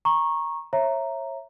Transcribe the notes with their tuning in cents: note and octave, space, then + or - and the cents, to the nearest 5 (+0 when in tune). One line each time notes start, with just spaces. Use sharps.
A#5 +10 C#6 -15
C#5 -30 E5 +15 A#5 +0